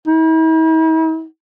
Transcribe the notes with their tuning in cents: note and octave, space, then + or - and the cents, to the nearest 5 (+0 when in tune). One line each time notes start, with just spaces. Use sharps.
E4 -45